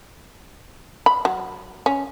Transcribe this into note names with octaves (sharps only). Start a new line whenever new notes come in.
B5
F#3
C#4